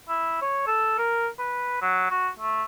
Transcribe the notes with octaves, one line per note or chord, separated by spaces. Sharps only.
E4
C#5
A4
A#4
B4
F#3
F#4
A3